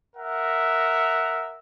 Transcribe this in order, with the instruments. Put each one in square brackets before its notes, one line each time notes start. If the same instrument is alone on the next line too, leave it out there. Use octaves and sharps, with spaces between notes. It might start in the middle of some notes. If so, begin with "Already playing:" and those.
[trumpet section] A#4 E5 F#5